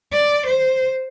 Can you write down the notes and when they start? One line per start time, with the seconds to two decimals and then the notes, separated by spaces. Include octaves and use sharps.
0.13 D5
0.46 C5